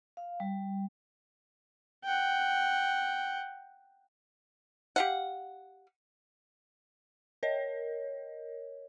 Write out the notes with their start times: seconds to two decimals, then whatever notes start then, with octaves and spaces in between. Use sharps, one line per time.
0.17 F5
0.40 G3
2.04 F#5 G5
4.96 G4 F5 F#5
7.43 A#4 C#5 D#5